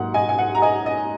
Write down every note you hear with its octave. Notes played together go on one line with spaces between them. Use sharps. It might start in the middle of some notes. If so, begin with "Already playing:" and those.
Already playing: G#2 F#3 A#3 F#5
D#5 G#5
G#5
F#5
A#5
D#5 G#5
D#5